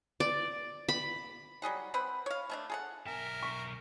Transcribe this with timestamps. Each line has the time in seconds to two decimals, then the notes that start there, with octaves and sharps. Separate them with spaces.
0.20 D5
0.89 B5
1.62 F#3 G3 G#4 F#5
1.94 C4 B4 F#5 B5
2.26 C#5 F5
2.50 A3 C#4 D4
2.70 G#4 A4 F#5
3.06 B1 A#4 E5 G#5
3.43 C#6 B6